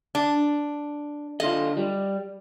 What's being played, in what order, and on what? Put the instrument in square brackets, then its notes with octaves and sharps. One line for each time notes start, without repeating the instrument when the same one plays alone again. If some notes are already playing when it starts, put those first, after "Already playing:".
[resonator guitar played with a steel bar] D4
[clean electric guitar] D3 F4 [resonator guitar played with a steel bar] D#5
[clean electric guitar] G3